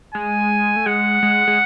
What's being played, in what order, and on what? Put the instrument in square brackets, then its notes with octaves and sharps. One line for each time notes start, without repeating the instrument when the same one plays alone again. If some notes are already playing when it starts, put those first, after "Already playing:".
[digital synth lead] G#3 [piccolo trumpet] G#5
[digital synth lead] A3
[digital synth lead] G#3 [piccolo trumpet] F#5
[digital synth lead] G#3
G#3